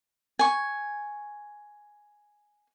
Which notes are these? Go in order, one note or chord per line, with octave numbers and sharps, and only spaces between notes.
G#5 C#6